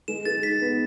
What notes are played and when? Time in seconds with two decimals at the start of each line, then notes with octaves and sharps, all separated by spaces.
0.08 G#3 E7
0.25 G#4 A6
0.43 D#4 B6
0.62 B3